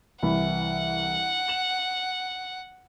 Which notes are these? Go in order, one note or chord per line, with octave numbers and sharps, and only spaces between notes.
C2 E3 F#5 B5
E7 F#7